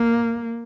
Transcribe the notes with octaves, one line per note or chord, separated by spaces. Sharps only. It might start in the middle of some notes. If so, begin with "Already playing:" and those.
Already playing: A#3